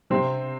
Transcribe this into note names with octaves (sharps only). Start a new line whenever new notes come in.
C3 C4